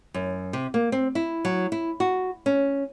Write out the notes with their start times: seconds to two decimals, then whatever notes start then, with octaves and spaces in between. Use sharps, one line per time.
0.14 F#2
0.53 C3
0.74 A#3
0.92 C4
1.15 E4
1.45 F#3
1.72 E4
2.00 F#4
2.46 C#4